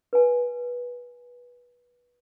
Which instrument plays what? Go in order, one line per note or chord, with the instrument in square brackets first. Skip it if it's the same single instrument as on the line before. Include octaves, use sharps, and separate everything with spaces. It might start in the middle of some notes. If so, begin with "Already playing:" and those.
[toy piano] B4 G#5